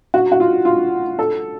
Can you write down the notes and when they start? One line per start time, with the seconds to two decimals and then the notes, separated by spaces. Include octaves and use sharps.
0.14 F#4
0.32 F#4
0.40 F4
0.65 F4
1.19 A4